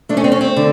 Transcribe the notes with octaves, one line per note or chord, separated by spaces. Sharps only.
A3 D4
C#4
C4
C#4
C4
D3